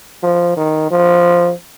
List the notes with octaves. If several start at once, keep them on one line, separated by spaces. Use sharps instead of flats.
F3
D#3
F3